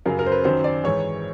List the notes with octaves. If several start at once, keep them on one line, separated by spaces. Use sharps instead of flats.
F#2 C#3 F#3 A#4
A#4
C5
B4
F#2 D#3 F#3 C5
D5
G#2 E3 C#5